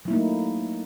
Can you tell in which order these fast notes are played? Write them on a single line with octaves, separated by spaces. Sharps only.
F#3 E4 A#3 D#4 A3